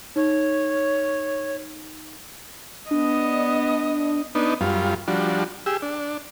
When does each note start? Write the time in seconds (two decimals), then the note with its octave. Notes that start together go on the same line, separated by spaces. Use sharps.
0.16 D#4 C#5
2.91 B3 D4 D#5
4.35 B3 D4 D#4
4.61 F#2 G3 F4
5.08 F3 G3 D4 F#4
5.66 G4 G#4 E6
5.82 D4